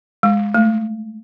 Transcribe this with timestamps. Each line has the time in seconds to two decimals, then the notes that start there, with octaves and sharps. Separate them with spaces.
0.23 G#3
0.54 A3